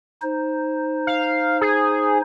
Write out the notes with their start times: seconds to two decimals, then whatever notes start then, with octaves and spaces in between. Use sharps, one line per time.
0.22 D#4 C5
1.07 F5
1.61 G#4